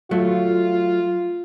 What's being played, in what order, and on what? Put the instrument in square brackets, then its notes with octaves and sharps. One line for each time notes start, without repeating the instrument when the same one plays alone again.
[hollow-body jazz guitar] F#3 A3 [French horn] F4